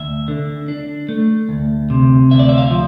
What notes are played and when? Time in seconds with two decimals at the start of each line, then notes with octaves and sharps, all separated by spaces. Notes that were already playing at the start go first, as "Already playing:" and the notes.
Already playing: D2 E5
0.28 D3
0.68 D4
1.09 A3
1.49 D2
1.90 C3
2.31 D2 E5
2.39 D5
2.49 E5
2.58 F5
2.70 F3